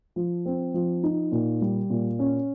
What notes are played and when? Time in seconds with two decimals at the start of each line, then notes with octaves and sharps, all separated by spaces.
0.16 F3
0.46 C4
0.74 F3
1.03 D#4
1.32 A#2
1.61 G3
1.90 A#2
2.19 C#4